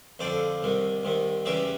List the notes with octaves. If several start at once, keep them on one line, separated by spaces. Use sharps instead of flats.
F2 D3 F3 C5 D5
C2 C3 D#3
C2 C3 D#3
E2 C#3 E3 G3 D5 E5